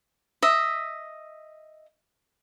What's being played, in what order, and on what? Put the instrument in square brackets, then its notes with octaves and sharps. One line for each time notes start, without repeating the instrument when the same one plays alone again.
[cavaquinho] D#5 E5